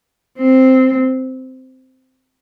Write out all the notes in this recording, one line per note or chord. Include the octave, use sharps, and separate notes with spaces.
C4